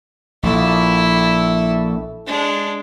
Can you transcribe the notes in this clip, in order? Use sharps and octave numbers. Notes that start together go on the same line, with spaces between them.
A#1 E4 A4
G#3 D4